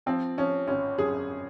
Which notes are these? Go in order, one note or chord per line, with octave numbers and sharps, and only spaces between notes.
F3 C4
F3 C#4
G#1 C#4
F#2 G#4